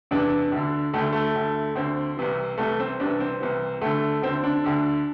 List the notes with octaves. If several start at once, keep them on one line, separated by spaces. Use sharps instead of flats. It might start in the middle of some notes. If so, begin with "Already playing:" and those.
E2 C3 E3 D4
D2 D3
D2 D3 A3
A3
D2 D3
D2 D3 C4
C2 C3 E3
C2 C3 E3 A3
C4
C2 C3 E3 D4
C4
C2 C3 E3
D2 D3 A3
D2 D3 C4
D4
D2 D3